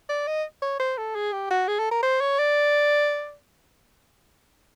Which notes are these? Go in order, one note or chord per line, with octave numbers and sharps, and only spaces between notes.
D5
D#5
C#5
C5
A4
G#4
G4
F#4
G#4
A4
A#4
C5
C#5
D5